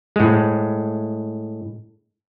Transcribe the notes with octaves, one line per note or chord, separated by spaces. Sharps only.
A2 G#3